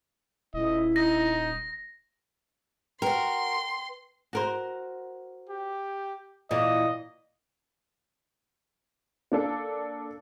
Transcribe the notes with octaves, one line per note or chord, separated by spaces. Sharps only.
D#1 E4 D#5
D#4 A#6
F#4 A#4 B4 G5 C6
F#4 A#4 C5
G4
A#2 E3 D#5
A#3 D4 A4